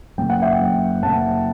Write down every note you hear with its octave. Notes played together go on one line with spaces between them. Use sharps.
F#1 G5
F#5
E5 G5
F#2
F#1 F#5 A5